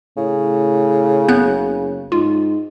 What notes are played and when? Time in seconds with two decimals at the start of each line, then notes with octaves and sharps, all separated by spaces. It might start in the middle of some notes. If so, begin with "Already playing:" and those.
0.17 A2 C#3
1.29 F#1 B3 F#6 G6
2.12 G#2 F4